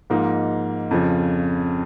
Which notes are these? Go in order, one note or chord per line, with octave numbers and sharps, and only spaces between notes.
G#2 F3 A#3 D#4
F2 C#3 F3